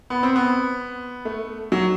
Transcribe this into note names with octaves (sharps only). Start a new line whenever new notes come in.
B3
C4
B3
A3
F#3